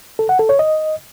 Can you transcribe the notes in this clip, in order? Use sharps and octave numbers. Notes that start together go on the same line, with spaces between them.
A4
F#5
A4
C#5
D#5